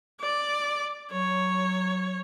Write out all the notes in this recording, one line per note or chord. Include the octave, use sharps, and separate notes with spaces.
D5
F#3 C#5